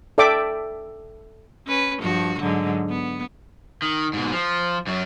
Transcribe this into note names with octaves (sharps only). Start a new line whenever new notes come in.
A4 D5 E5 G5 D6
C#4 B4
G2 F3 F#4
G#2 D3 F#3
B3
D#3
G#2 B2
F3
F#2 F#3